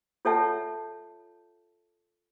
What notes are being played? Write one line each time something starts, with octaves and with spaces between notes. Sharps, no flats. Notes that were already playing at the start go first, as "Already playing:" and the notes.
F4 A4 C#5 E5 F#5 A5